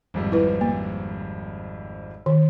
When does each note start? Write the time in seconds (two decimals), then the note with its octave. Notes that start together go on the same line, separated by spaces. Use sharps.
0.14 G#1 F2 G3
0.32 E4 B4
0.61 A#3
2.26 D#3